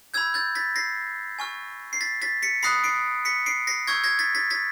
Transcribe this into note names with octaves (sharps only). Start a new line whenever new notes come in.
B5 E6 G6 G#6
G6 A6
A6 B6
A#6 C7
G#5 C#6 F6
C7
A6 B6
A6 B6
B6 C#7
B5 D#6 F#6 A#6 C7
C7 D7
B6 C#7
C7 D7
A#6 C7
C#6 E6 G6 G#6 A#6
G#6 A#6
A6 B6
A6 B6
A6 B6